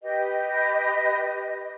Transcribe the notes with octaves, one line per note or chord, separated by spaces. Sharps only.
G4 B4 D#5